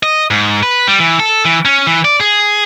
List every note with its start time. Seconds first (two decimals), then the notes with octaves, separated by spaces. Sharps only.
0.03 D#5
0.31 G#2
0.63 B4
0.87 G3
1.00 E3
1.20 A4
1.45 E3
1.65 C#4
1.87 E3
2.05 D5
2.20 G#4